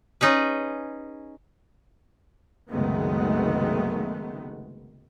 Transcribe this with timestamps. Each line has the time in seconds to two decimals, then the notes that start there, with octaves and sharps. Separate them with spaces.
0.21 C#4 D#4 G#4 B4
2.69 F#1 C2 D#3 G#3 A3 B3